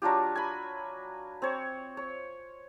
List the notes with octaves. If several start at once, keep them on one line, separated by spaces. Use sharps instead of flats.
F#3 D4 F4 G4
G#5 B5
C4 C#5
C#5